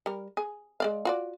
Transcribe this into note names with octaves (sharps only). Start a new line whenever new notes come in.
G3 A#4
G#4
G#3 D5 F5
F4 F#4 D5